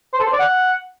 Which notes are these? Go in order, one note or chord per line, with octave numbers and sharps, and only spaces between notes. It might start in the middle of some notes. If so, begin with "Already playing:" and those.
C5
A4
C5
D5
F#5